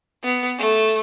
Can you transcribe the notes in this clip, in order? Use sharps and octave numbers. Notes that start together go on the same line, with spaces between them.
B3
A3